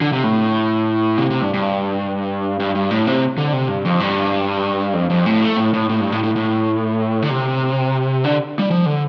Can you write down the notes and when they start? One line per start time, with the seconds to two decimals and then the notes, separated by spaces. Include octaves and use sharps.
0.01 D3
0.12 C3
0.24 A2
1.18 C3
1.31 C3
1.42 G2
1.54 G2
2.60 G2
2.75 G2
2.91 A2
3.07 C3
3.38 D3
3.53 C3
3.69 G2
3.85 F2
4.00 G2
4.94 F2
5.10 F2
5.26 A2
5.42 A3
5.57 A2
5.74 A2
5.89 A2
6.01 G2
6.12 A2
6.23 A2
6.36 A2
7.22 D3
7.30 C3
8.24 D3
8.59 G3
8.71 F3
8.86 D3